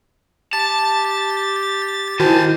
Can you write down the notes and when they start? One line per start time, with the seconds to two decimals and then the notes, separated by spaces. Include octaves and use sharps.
0.53 G4 A5 A6
2.20 D#3 E4 F#4 C5 G#5 A5